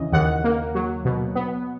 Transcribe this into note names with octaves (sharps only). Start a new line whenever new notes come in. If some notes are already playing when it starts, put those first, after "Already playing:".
Already playing: D#2 C#3 E3 D#5
D#2 F#5
A#3
F#3
B2
B3